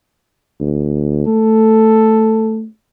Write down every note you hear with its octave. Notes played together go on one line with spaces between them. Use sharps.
D2
A3 A4